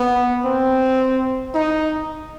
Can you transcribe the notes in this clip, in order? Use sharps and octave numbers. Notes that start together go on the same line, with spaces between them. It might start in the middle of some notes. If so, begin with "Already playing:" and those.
Already playing: B3
C4
D#4